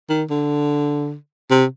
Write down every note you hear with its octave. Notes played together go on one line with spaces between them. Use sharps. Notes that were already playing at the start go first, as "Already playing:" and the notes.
D#3
D3
C3